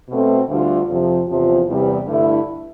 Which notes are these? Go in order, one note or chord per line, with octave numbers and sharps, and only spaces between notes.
B2 A3 C4
D2 D3 G3 D4 F4
F2 C3 F3
E2 C3 F3
E2 C3 G3
G2 D3 A3 E4